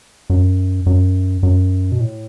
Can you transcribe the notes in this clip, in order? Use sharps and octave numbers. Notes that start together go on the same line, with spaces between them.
F#2
F#2
F#2
B2
A2